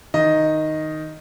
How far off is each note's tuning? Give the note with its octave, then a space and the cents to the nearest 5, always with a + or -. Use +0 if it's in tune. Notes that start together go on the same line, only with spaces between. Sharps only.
D#3 +0 D#5 +0